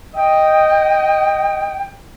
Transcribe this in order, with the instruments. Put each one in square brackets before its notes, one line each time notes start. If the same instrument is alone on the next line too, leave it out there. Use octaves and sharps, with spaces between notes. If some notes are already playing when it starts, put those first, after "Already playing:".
[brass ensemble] D#5 [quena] G5